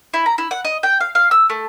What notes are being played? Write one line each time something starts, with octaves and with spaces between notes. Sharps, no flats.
E4
A#5
E4
F#5
D#5
G5
F5
F5
E6
A3